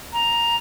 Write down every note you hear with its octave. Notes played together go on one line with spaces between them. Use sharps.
A#5